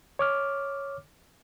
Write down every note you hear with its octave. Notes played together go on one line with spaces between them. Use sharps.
C#5 D6 F6